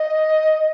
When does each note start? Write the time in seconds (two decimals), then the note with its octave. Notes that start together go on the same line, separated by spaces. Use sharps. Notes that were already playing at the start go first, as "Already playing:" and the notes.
Already playing: D#5